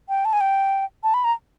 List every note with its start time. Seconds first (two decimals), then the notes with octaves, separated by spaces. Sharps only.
0.09 G5
0.25 A5
0.33 G#5
0.41 G5
1.03 A5
1.14 B5
1.24 A#5